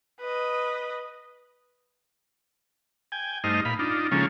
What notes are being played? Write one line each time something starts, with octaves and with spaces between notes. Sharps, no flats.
B4 D#5
G5 G#5
G2 A3 D#4 C5 D#5 F6
A#2 F5 B5
D4 D#4 F4
C#3 F3 G#3 A#3 C#4 A4